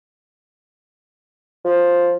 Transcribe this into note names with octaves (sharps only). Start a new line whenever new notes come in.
F3